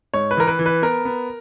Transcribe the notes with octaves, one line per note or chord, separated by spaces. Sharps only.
G#2 C#5
B4
E3 A#4
B4
E3
B4
B3 A#4
B3